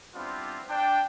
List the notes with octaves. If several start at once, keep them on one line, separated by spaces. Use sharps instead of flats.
G3 B3 C4 D4 E4 F4
D4 G5